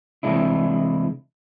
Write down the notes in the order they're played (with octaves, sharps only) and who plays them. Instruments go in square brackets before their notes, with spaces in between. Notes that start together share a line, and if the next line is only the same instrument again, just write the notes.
[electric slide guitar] C3 E3 G#3 D4 E4